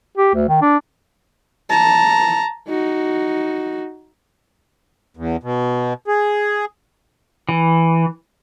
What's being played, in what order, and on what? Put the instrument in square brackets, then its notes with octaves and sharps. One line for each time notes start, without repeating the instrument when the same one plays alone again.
[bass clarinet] G4
D2
D#3
D4
[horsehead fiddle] A5 A#5
D#4 F#4
[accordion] E2
B2
G#4
[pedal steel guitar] E3